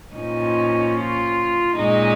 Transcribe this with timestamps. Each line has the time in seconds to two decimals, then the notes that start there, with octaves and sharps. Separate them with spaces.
0.16 A#2 F3 C#4 D#4
0.96 F4
1.77 A#2 G#3 C#4 D#4